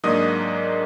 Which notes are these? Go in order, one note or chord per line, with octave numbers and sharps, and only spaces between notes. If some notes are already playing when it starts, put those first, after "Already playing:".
G#2 F#3 A#3 D4 D#5 D#6